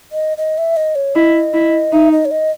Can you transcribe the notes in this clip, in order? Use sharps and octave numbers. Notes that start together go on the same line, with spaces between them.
D#5
D#5
E5
D#5
C#5
E4 D#5
E4
D#4 E5
D#5
C#5
D#5